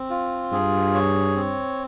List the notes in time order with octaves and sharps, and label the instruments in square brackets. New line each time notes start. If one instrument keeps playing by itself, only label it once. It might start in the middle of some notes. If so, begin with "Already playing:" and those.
Already playing: [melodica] C4
F4
[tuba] G2 [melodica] G#4
[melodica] C#5
C4